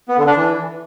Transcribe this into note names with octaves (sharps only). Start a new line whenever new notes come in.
B3
D3
D4
E3